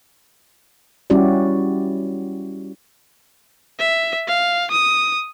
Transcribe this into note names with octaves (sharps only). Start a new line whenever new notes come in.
G3 C#4 E4 F#4 G4 D5
E5
F5
D#6